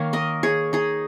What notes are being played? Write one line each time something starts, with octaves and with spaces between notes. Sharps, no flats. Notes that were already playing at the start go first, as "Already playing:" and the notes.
Already playing: D#3 A#3 C#5 F5
A#4 D#5
G#4 C#5
D#4 G#4